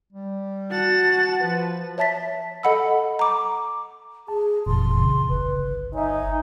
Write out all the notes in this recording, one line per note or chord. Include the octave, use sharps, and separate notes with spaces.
G3
F#4 F#5 A5 A6
F3 F4 B4
C#5 E5 A5 A6 B6
A4 D#5 F#5 B5 E6
A#5 D6
G#4 A5
F#1 F2 A#2 E3 C6
C2 C#3
G1 B4
D#4 C#5 E5 G#5